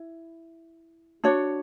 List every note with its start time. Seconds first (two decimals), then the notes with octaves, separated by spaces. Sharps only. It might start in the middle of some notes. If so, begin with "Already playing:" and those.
Already playing: E4
1.24 D4 F#4 C#5